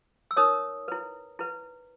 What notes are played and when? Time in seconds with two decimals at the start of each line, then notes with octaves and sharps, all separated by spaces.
0.31 E6
0.37 D#4 A#4 C#5 D#6
0.88 E4 B4
1.39 E4 B4